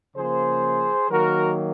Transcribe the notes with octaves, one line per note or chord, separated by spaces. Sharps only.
C#3 F3 A#3 G#4 C5
D#3 F#3 A#3 F#4 A#4